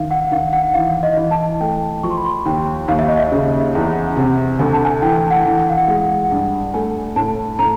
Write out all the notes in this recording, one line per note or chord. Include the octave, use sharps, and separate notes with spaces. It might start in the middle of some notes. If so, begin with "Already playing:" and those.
Already playing: D#3 E5 F5
F#5
D#3 F5
F#5
E3 F5
D#5
E3
A5
A3 G5
F3 C#6
C6
B5
C6
D#2 G5
D#2 F5
E5
D#5
E5
C#3
E5
E2
F#5
C3 G#5
D2 G#5
A5
G#5
E3 G5
F#5
E3
F#5
F5
F#5
G#3 F#5
F#5
G2 G5
A3 G#5
A2 A5
A2 A#5